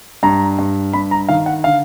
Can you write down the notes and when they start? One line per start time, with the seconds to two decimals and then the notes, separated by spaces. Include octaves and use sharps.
0.23 G2 A#5
0.59 G2
0.93 G2 B5
1.11 A#5
1.29 D#3 F5
1.46 F#5
1.64 D3 F5